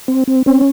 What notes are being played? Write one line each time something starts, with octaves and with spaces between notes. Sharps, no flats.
C4
C4
C4 C#4